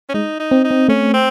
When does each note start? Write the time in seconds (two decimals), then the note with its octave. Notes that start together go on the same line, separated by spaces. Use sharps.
0.09 C#4
0.14 G#3 D#4
0.40 D#4
0.51 C4
0.64 D#4
0.71 C4
0.88 A3 C#4
1.13 C4